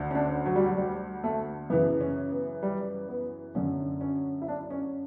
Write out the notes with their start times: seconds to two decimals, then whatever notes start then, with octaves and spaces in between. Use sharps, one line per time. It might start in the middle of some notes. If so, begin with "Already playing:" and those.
Already playing: D2 D3
0.11 C#4
0.15 D4
0.46 F#3
0.56 G3
0.67 F#3
0.77 G3
1.24 A3
1.70 F#2 C#3 E3 B3
2.01 C#4
2.31 B3
2.63 G3
3.09 B3
3.55 F#2 D3 C#4
4.01 C#4
4.42 E4
4.48 D4
4.70 C#4